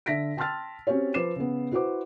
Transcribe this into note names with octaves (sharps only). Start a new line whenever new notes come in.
D3 E5 A#6 B6 D7
G5 A5 C6 E6 F6 A6
C4 C#4 F#4 G4 C#5
F3 B4 C5 D6 C7 E7
C#3 B3
E4 F#4 B4 C5 F#5 D6